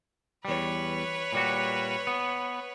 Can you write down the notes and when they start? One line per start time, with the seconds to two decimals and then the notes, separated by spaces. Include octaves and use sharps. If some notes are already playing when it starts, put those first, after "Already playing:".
0.45 E2 G3 B4 C#5
1.33 A#2 G3 F#4
2.07 B3